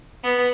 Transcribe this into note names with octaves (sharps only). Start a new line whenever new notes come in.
B3